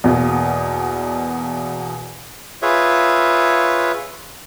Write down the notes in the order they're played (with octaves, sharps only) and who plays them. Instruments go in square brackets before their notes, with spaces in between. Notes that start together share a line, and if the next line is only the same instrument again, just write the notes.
[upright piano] E2 B2 A#3
[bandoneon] F4 G#4 B4 C#5 E5